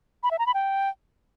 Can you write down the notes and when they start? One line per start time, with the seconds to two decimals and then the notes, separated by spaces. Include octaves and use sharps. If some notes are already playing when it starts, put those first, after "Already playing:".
0.23 B5
0.31 E5
0.39 A#5
0.46 B5
0.54 G5